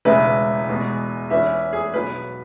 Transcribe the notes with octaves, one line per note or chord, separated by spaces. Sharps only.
E1 E2 C#3 G#3 B4 E5
E2 B2 G#3 B3
E2 E3 C#4 B4 E5
G#4
B1 B2 F#3 B4